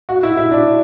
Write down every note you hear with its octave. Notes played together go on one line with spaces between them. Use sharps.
F#4
E4
E4
D4